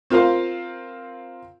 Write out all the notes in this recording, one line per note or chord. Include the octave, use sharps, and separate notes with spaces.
C4 F4 A#4 C5 F5